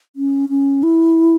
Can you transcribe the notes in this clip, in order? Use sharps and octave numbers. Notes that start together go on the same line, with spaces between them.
C#4
C#4
E4